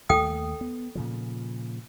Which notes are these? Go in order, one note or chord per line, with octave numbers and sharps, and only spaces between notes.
D#2 A3 A4 G5 D#6
B3
A#2 C#3 F3